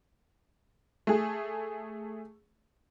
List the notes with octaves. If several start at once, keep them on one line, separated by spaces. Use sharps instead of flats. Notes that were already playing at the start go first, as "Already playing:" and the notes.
A3 G#4